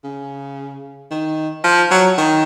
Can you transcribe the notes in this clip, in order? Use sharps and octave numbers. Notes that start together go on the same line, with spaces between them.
C#3
D#3
F3
F#3
D#3